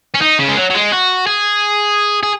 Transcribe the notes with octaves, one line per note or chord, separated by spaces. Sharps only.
C#4
D#4
C#3
G#3
F#3
F#3
G#3
F#4
G#4
G#4